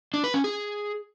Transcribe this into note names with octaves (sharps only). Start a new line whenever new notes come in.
D4
B4
C#4
G#4